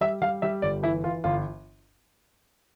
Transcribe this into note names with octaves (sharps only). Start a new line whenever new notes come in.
G3 E5
G3 F5
G3 E5
G1 D5
E3 E4
E3 F4
G1 F4